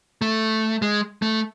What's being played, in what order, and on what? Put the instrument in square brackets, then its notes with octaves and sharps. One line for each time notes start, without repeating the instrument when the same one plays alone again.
[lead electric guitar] A3
G#3
A3